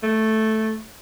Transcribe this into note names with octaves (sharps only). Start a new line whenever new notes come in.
A3